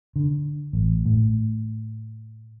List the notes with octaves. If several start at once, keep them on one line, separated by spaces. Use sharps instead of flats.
D3
A1
A2